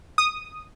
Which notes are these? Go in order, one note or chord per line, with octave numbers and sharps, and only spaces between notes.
D#6